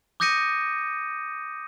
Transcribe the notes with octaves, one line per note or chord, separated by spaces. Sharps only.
D6 D#6 G6 A#6 C#7 D#7